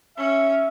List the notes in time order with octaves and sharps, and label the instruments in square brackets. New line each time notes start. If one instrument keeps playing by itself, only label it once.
[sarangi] C#4 [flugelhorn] E5